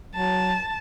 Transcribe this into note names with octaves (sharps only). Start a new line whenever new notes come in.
F#3 A5